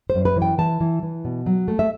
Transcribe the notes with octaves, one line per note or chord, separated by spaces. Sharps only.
F#2 C5
B4
E3
G5
E3 A5
E3
E3
B2
F#3
A3
E5